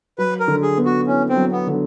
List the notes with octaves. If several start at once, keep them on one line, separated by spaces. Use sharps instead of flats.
F#3 B4
A#4
D3
G#4
B3
F#4
C#4 E4
C4
F#3
B3
D3